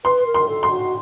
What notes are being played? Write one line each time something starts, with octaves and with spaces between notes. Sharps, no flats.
B4 C6
A#4
C6
A4
C6
F#4